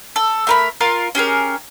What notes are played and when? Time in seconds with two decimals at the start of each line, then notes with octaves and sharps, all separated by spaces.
0.16 A4
0.47 A3 A#4 B5
0.81 F4 A#4 F5
1.15 C#4 G4 G#4 A#4